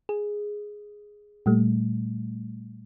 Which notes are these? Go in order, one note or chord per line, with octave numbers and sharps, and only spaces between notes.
G#4
A#2 G3 A3